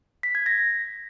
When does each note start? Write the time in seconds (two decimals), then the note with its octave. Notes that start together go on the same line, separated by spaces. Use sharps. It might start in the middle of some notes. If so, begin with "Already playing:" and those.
0.23 B6
0.35 G#6
0.46 A#6